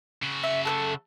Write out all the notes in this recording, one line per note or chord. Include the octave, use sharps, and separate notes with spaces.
C#3 F#4
E5
A3 B3 A4